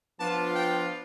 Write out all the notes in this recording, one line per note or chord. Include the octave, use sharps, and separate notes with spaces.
F3 B3 D4 F4 A5
G5